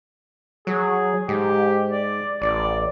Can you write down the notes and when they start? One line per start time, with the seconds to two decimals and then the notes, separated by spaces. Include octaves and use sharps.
0.67 F#3 G#4
1.29 G#2 G4
1.92 D5
2.42 A1 D5